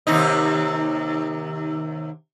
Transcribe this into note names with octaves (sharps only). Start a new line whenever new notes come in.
D#2 C3 D#4